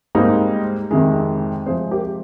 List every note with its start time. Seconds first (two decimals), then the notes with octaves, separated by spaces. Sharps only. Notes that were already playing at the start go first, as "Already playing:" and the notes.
0.15 G#2 G3 A#3 C4 D#4
0.91 F2 C3 D#3 G#3
1.66 C3 F3 G#3 G#4 C5
1.91 G4 A#4